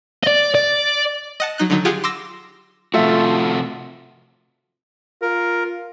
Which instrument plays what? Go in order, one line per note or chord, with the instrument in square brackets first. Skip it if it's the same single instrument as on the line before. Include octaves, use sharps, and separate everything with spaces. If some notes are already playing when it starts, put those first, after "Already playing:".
[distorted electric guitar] D5 D#5
D5
[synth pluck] D#5 F#5 A5
F#3 D#4 F#6
D3 D#3 F#3 D#4
F4 G4 G#4 F#5
C6 D6 E6 A#6
[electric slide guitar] C3 F3 F#4 [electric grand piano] A3 F4 E5
[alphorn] F4 [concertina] A#4